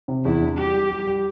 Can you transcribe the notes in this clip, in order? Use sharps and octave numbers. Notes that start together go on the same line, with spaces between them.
C3
E2 E4
D4
G3 G4
G3
G3
G3